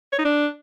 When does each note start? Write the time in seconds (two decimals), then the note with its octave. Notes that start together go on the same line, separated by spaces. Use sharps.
0.13 C#5
0.19 D#4
0.25 D4